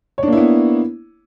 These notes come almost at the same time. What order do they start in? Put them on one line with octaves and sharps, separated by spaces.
C#5 D4 A#3 E4 B3